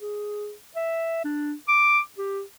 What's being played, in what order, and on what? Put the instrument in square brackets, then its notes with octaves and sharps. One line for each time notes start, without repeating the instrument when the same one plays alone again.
[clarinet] G#4
E5
D4
D6
G4